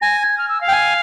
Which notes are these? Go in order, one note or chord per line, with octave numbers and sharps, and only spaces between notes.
G#5 A#6
G#6
F6
E6
F5
G5
G#5